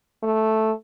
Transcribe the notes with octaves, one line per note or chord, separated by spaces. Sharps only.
A3